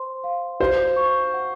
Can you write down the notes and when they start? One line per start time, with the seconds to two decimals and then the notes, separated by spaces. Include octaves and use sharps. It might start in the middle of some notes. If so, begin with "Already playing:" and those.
Already playing: C5 C6
0.24 F5
0.60 F#4 C5
0.96 C#6
1.33 F#5